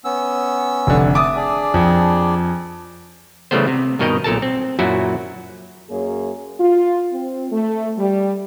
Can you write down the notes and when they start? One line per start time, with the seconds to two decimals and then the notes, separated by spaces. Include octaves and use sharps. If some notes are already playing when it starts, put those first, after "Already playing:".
0.05 B3 C#4 E6
0.87 F1 D3
1.14 E5 A5 D6 D#6
1.36 D4 G#4 D5
1.74 F2
3.51 C#3 E3 G3 A3 B3 C5
3.67 C3
3.99 G2 B2 D#3 A#4 D#5 G5
4.24 B1 A#2 A4 A#4 A5
4.42 C4
4.79 F#2 A#2 F#3 E4 F#4
5.90 F#2 A#3 G#4 C#5
6.60 F4
7.11 C4
7.51 A3
7.98 G3